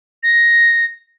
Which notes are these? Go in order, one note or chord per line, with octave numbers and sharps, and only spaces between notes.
A#6